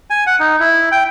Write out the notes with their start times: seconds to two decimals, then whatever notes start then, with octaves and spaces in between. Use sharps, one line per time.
0.10 G#5
0.27 F#5
0.40 D#4
0.60 E4
0.92 G5